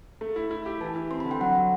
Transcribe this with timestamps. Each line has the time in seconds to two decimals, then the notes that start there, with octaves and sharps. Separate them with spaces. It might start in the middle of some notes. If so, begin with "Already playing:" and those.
0.21 A3
0.36 E4
0.51 E4
0.66 G4
0.80 E3 A5
0.96 E4
1.11 C4 C6
1.20 D3 B5
1.31 G5
1.40 F#3 F#5
1.55 F#3